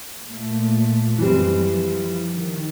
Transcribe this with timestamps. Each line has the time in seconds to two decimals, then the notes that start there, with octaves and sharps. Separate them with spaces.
0.22 A#2 A3
1.18 F#2 E3 G3 C4
1.51 F3
2.35 D#3